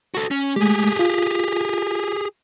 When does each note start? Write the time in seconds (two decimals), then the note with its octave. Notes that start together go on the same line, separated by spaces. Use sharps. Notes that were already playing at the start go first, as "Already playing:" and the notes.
0.15 F#4 A4
0.31 C#4
0.56 G#3 A3 G4 G#4
0.99 F4